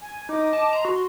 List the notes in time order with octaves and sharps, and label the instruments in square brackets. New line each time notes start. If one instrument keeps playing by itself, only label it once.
[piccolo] G#5
[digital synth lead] D#4 [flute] D#5 [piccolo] D6
[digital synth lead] A5
[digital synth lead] A#5 [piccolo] C6
[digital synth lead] F#4